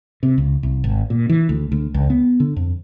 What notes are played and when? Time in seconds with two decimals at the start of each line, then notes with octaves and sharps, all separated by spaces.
0.23 C3
0.38 C#2
0.63 C2
0.84 G#1
1.10 A#2
1.29 E3
1.49 D2
1.72 D2
1.94 C#2
2.10 B3
2.40 D3
2.56 F2